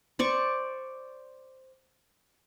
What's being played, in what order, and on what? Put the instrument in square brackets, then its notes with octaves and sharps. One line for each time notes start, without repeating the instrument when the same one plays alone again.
[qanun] C5 D5 C#6